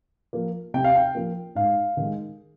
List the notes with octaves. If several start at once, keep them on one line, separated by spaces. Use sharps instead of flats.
F3 A#3
C3 G5
F5
G5
F3 A#3
G#2 F5
D#3 G#3